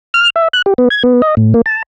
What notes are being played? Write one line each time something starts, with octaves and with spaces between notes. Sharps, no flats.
F6
E5
F#6
G4
B3
G#6
B3
D#5
A2
A#3
A5